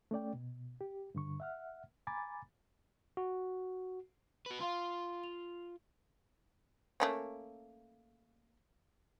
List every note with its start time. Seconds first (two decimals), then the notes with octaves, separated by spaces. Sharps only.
0.11 A3 C#4 D5 G5
0.34 B2
0.81 G4
1.15 G2 D3 C#6
1.40 E5 F#5 F6
2.07 G#5 A#5 B5 D6 A6
3.17 F#4
4.46 F#4 B4
4.60 F4 F5 C6
5.24 F7
7.00 A3 A#3 C#4